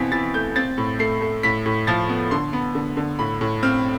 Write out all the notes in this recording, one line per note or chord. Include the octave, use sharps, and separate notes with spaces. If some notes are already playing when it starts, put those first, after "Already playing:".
Already playing: B2 E3 C4 B6
E3 A6
A3 G6
C4 A6
A2
A3 C7
A3
A2 B6
A2
F3 A6
B3
D3 C6
B3
D3
D3
A2 B5
A2
C4 F6